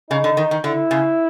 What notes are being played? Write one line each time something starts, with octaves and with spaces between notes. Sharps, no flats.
C#3 D#4
D3
D#3
D#3
D3 E4
C#3